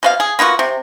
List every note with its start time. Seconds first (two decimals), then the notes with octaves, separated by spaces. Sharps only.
0.03 B2 C#4 F5
0.20 G#4
0.39 A#3 B3 F4 F#4
0.59 C3